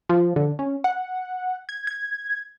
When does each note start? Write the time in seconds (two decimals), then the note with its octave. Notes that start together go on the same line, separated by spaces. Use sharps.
0.09 F3
0.36 D3
0.59 C#4
0.84 F#5
1.69 G#6
1.87 G#6